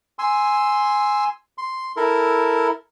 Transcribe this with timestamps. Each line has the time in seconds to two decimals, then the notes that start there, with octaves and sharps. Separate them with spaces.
0.19 G#5 C6 E6
1.58 C6
1.97 E4 A4 A#4